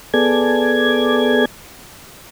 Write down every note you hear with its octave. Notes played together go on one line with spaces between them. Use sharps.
B3 G#4 A4 D5 G#6